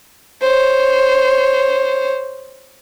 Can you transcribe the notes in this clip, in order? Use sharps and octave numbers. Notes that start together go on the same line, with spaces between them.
C5 C#5